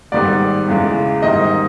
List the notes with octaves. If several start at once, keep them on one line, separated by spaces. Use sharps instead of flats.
G#2 D#3 G3 B3 D5
E2 C#3 E3 G#3
G#2 D#3 G3 A#3 D#5